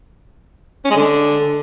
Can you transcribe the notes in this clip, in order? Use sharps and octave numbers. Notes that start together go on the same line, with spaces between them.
C#4
G#3
D3